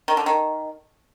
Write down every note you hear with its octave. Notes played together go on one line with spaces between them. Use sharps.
D#3
D3
D#3